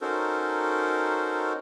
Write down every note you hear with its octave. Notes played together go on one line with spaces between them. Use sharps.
C#4 D#4 F#4 A4 A#4 C5